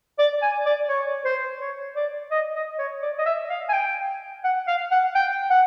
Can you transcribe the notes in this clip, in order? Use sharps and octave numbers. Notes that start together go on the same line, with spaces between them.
D5
G#5
D5
C#5
C5
C#5
D5
D#5
D#5
C#5
D5
D#5
E5
F5
G#5
G5
F#5
F5
F#5
G5
F#5